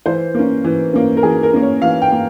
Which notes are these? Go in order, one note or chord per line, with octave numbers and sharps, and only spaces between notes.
E3 C5
A#3 C#4
E3
A#3 C#4
A#4
E3 G#4
A#4
A#3 C#4
C#5
E3 F5
G5
A#3